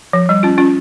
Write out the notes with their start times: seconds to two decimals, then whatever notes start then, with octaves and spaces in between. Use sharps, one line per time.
0.13 F3
0.29 G3
0.43 C#4 F4
0.58 C#4 F4